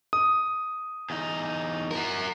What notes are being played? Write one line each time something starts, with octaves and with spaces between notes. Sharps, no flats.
D#6
E2 D#4
F#4 A#4